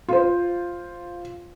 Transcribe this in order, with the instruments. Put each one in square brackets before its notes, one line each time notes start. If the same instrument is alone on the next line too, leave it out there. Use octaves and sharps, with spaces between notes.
[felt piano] F4 C5